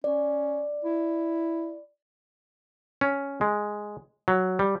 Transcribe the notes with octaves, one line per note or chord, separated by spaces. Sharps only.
C#4 D5
E4
C#4
G#3
F#3
G3